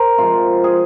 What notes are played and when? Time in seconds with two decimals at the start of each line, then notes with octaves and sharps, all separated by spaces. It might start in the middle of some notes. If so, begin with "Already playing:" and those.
Already playing: A#4 C5
0.18 C3 F3 G#3 F4
0.64 G#4